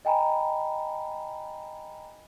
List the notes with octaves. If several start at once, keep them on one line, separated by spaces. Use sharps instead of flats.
D#5 G5 G#5 A#5 B5